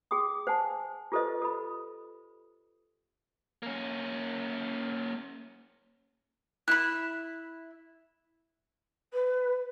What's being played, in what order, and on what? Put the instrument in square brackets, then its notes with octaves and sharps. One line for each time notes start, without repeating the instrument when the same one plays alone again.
[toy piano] G#4 G5 C6 D#6
C5 F#5 G#5 A5
F4 G4 A4 B4 C5 D#5
A4 B5
[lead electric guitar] A#3 C#4
[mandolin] E4 B5 [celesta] F#6
[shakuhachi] B4